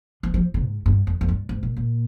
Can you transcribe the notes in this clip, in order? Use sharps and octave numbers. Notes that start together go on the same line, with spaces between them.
F3
F3
D3
G#2
G2
F2
F2
G2
G#2
A#2
A#2